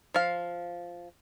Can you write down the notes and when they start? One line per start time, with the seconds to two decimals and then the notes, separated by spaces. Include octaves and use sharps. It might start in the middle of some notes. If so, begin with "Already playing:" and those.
0.14 F3 F5